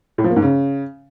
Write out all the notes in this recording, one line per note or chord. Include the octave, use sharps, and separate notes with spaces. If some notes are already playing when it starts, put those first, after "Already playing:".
A2
F3
A#3
G#2
C#3